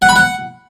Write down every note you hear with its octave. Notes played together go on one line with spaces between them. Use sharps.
F#5
B5
F#5